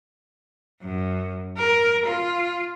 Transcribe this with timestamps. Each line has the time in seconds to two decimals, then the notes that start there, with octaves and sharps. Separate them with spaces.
0.82 F#2
1.57 A#4
2.06 F4